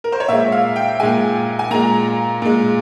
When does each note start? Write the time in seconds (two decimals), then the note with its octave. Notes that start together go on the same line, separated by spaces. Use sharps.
0.04 A#4
0.12 C5
0.20 C#5
0.28 A#2 G#3 E5
0.52 F5
0.76 G5
1.00 A#2 G#3 G#5
1.59 G#5
1.71 A#2 G#3 A#5
2.42 A#2 G#3